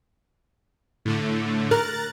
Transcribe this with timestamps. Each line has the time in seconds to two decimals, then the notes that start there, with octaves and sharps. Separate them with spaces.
1.05 A2 D3 A3
1.71 A#4 A#5 F#6 A6